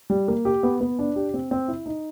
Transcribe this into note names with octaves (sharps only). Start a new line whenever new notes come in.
G3
A#3
G4
B3
B3
D4
G4
C4
C4
E4
D#4